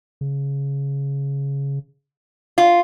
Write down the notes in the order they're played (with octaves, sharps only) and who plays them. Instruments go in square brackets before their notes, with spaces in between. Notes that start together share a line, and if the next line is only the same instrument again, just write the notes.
[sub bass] C#3
[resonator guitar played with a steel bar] F4